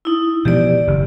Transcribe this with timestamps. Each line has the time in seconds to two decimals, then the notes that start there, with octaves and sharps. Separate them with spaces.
0.05 D#4 E4
0.45 B2 E3 F3 G4 D5
0.87 F#1